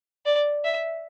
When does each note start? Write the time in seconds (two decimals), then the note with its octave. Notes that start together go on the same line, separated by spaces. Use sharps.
0.26 D5
0.64 E5